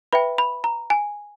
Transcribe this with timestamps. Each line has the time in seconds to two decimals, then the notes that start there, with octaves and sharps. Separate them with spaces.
0.13 B4 E5 G5 B5
0.38 B5
0.64 A#5
0.90 G#5